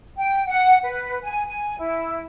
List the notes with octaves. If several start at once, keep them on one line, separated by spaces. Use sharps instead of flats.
G5
F#5
B4
G#5
G#5
E4